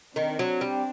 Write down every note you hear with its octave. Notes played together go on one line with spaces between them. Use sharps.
D#3 C4 D4
F#3
G3